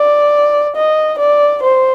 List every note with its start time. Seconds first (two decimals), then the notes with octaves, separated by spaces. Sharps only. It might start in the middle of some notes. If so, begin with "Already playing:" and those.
Already playing: D5
0.76 D#5
1.19 D5
1.63 C5